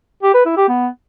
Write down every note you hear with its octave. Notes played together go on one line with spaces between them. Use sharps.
G4
B4
E4
G4
B3